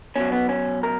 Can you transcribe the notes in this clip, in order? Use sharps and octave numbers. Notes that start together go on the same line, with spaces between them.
B2 F#3 C#4
B3
C#4
A#4